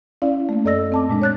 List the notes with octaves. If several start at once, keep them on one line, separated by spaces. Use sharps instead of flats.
C#4 E4 D5 F5
A3 A#3
F#2 A4 D5 D#5 E6 A#6
C4 A5 D6
A#2 G#3 D4
C#5 F#6 A6